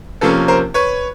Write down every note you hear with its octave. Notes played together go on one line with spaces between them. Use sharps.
C3 F3 A#3 C#4 A4 B4
A#4 C5
B4 C#5